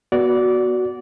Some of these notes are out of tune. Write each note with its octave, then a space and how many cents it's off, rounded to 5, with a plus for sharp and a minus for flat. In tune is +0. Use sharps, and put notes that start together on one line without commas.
B3 -20 F#4 +0 D5 -20